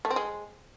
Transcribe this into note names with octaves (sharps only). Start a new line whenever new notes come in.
A3
C4
G#3